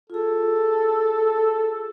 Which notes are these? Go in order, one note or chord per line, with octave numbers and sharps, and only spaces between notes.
F4 G#4 A4